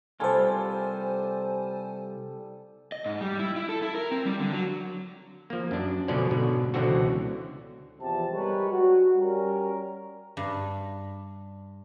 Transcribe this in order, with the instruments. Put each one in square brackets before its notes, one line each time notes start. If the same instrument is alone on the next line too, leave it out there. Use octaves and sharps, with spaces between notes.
[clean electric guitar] C2 G#2 F4 [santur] G3 A3 A4 [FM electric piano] C5 G#5
[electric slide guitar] D#5
G#2
G3
E4
E4
A4
E4
A#4
C4
G3
D3
F#3
[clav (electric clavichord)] F3 A#3
F#2 D4
B2 D3 F3 C#4 D4 D5
G#2 B2 D3
C#2 B2 D3 E3 C4 F#4
[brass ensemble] E2 C3 F3 A5
G3 G#3 G4 A#4 B4 C#5
F#4
G3 C#4 A#4
[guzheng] G2